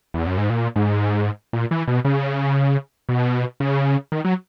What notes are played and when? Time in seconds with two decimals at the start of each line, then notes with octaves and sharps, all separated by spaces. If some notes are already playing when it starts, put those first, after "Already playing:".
0.14 E2
0.27 F#2
0.38 G#2
0.50 A#2
0.76 G#2
1.53 A#2
1.71 E3
1.87 B2
2.05 C#3
3.09 B2
3.60 C#3
4.12 D#3
4.25 F#3